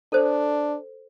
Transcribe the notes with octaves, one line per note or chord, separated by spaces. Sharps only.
D4 A4 C5